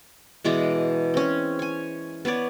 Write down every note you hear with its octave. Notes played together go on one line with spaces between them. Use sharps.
B2 E3 G#3 D5
C4 C#4
C#5 G#5
B3 B4 C#5 D5